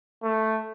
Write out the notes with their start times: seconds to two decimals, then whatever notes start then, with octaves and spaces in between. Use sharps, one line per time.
0.23 A3